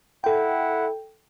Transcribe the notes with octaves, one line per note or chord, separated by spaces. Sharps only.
E4 A4 F#5 G5